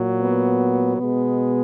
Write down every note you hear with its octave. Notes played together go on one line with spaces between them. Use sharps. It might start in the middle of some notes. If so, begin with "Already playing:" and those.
Already playing: A#2 F#3
B3
B2 G#3 B3